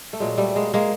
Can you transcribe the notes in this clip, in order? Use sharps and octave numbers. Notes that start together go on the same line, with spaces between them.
A3
A#2 F#3 G#3
G3 A3
G#3 A#3
G#3 A#3